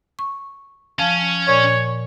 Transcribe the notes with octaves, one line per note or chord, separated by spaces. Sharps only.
C#6
F3 C#4 F5 A5
A#2 C#5 D5 G#5